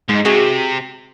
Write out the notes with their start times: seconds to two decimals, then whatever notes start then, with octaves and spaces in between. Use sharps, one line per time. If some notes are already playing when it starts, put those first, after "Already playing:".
0.09 G#2 G#3
0.25 C3 F#4 G#4